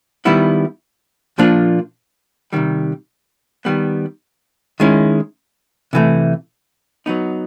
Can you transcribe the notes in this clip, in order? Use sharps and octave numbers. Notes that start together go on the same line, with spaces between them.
D#3 G3 B3 E4
A#2 F3 A#3 D4 F4
C3 D#3 G3
D#3 G3 B3
D#3 G#3 C#4 E4
C3 E3 A3
F#3 B3 D#4